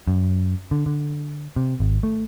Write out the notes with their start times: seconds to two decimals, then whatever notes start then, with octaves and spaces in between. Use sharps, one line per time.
0.07 F#2
0.71 D3
0.86 D3
1.56 C3
1.80 G#1
2.03 A3